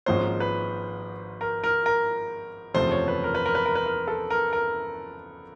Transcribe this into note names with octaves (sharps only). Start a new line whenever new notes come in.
G#1 G#2 F3 A#3 C#4 C5
B4
A#4
A#4
A#4
F#1 E2 C3 F3 A3 C5
C#5
B4
A#4
B4
A#4
B4
A#4
B4
A#4
A4
A#4
A#4